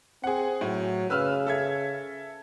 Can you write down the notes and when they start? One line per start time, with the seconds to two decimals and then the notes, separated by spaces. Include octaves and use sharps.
0.24 C4 G#4 F#5
0.61 A2 F#3
1.10 C#3 B4 E6 F6
1.47 A4 E5 G#6